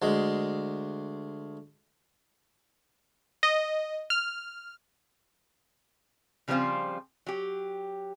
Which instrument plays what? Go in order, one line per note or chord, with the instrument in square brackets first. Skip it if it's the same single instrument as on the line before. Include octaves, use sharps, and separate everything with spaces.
[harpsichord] D2 G#3
[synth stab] D#5
F6
[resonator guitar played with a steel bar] C#3 F3 G3 A#3 C4 F4
F#3 G4